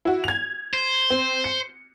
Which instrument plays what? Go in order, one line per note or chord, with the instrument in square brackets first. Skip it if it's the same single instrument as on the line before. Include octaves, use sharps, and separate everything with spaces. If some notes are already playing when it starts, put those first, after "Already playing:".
[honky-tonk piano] E4 F#4
G#6 F7
[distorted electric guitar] C5
[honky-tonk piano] C4
C#7